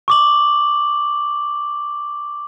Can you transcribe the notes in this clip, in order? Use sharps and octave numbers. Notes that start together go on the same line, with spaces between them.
C#6 D6 F#7